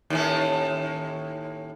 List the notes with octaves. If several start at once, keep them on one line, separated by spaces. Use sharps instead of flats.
D#2 A2 C#4